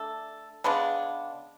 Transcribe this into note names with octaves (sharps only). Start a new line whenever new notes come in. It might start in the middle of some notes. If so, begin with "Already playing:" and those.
Already playing: A3 D4 A4
C#3 G#3 B3 D4